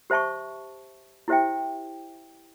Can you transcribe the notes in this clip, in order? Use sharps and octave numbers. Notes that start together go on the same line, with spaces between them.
G4 C5 E5 A5 C#6
E4 G4 C5 E5 G5